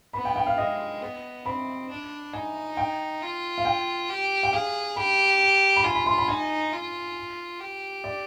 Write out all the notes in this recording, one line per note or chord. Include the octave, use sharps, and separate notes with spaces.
B3 B5
G5
G5
F5
G#3 D#5
B3
C4 B5
D4
D#4 G#5
G5
F4
F5
G5
G4
G5
G#4 F5
G4 B5
B5
F4 G#5
B5
C6
B5
D#4 G#5
F4
G4
D5